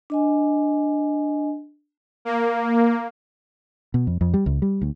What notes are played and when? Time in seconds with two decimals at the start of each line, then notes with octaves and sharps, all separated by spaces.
0.10 D4 D#5 G#5
2.25 A#3
3.94 B2
4.07 F2
4.21 F2
4.34 G3
4.46 C#2
4.62 G3
4.82 D2